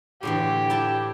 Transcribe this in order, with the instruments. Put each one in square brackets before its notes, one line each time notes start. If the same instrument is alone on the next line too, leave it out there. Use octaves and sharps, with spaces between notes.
[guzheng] A2 D3 E3 [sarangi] G4
[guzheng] E4 G5 A5